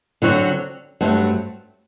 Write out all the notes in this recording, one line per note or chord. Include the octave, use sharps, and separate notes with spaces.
D3 F#3 C4 F#4
G2 F#3 A3 C4